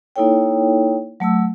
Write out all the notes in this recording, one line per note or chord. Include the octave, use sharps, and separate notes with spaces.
A#3 D#4 E4 A4 C#5 G5
F#3 A3 A5 E6